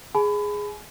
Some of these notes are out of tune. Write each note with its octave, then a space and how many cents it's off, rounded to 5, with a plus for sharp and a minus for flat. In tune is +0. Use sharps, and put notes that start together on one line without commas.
G#4 +0 G#5 +35 B5 +25